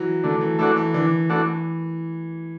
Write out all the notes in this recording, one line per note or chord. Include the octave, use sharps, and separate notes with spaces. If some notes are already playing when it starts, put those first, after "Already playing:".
Already playing: E3 F#3
D3 A3
E3
E3 A3 D4 F#4
E3
D3 E3
E3 A3 D4 F#4